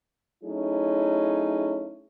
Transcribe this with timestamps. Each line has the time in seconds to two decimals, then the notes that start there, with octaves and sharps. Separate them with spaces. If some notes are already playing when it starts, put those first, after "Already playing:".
0.44 F#3 A3 C#4 D#4 E4 G#4